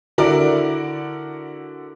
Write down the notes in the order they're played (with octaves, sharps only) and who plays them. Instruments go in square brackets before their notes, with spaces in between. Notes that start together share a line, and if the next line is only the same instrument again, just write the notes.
[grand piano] D3 E4 F#4 A#4 D5